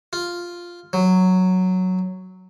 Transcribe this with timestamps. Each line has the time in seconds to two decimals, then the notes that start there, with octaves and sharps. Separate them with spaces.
0.13 F4
0.93 F#3